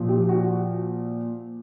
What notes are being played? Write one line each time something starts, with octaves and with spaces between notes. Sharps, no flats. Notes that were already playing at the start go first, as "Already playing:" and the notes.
Already playing: A#2 F3
G4
F#4